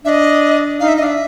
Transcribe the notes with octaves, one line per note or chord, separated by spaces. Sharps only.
D4 D#5 E5
D#4 F5
E5
D#5
D4 F5
E5